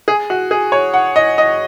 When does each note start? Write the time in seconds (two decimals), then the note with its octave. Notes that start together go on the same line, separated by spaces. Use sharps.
0.08 G#4
0.30 F#4
0.51 G#4
0.72 C#5
0.94 F#5
1.16 D#5
1.38 D#5